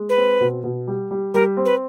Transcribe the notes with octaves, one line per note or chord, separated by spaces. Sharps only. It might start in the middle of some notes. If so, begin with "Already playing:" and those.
Already playing: G#3
B4
C4
B2
B2
G3
G3
G3 A#4
C4
B4